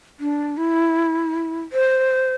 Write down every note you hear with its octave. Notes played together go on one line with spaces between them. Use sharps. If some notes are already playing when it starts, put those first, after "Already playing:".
D4
E4
C5